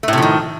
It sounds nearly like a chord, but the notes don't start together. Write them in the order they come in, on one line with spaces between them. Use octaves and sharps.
A3 A2 C3 F3 D#3